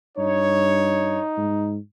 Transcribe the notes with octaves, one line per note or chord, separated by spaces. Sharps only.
G2 D#4 C#5
G#2